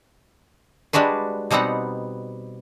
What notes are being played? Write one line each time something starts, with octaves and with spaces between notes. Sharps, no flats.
G3 G#3 D4 F#4 B4
B2 G3 B3 C4 D#4 F#5